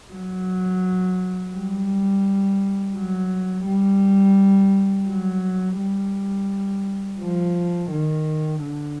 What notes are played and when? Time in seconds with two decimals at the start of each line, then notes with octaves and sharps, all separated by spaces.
0.13 F#3
1.55 G3
2.96 F#3
3.66 G3
5.08 F#3
5.78 G3
7.20 F3
7.91 D#3
8.61 D3